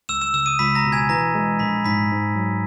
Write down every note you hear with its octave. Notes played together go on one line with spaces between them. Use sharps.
C#2 E6 E7
E6 E7
C#3 E6 E7
D#6 D#7
C#2 B5 B6
A#5 A#6
B2
G#5 G#6
E3 A#5 A#6
G#3
A#1 B5 B6
G#2 B5 B6
G#2
F#3